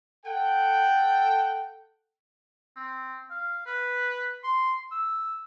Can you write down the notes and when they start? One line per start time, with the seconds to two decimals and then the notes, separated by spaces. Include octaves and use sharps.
0.25 A4 F#5 G5
2.76 C4
3.30 F5
3.66 B4
4.44 C6
4.92 E6